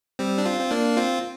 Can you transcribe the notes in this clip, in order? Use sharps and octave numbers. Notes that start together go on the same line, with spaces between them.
G3 C4
D4
C4 F4
C4
A#3 D4
C4 F4